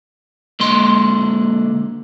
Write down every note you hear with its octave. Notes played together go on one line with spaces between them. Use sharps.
D3 G#3 A#3 C6